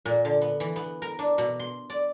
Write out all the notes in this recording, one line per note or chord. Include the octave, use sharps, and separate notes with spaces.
A#2
D3
B3
E3
B3
A#4
D4
B2
C6
D5